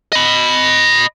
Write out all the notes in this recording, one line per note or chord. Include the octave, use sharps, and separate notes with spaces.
D#5 B5